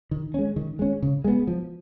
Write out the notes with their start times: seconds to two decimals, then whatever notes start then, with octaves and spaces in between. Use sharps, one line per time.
0.11 D#3
0.34 G#3 C#4
0.56 D#3
0.79 G#3 C#4
1.02 C#3
1.24 G#3 B3
1.47 F3